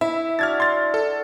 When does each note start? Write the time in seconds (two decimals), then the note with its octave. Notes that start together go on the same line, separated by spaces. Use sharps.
0.01 E4 E5
0.39 D4 F#4 F6 G#6 A6
0.60 C6 A6
0.94 A4